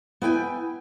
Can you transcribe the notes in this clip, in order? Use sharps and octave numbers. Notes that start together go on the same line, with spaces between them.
B3 E4 G5 G#5